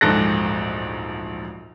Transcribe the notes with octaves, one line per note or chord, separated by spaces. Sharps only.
D1 A#1 G#2 A4 F#6 A#6